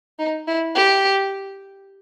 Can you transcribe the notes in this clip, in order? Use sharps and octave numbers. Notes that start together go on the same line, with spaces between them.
D#4
E4
G4